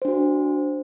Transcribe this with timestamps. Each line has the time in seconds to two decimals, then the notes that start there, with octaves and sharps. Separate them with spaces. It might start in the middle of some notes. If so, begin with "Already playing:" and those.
0.02 C5
0.05 D4
0.08 F#4